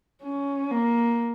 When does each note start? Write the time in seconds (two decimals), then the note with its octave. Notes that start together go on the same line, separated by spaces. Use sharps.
0.23 C#4
0.71 A#3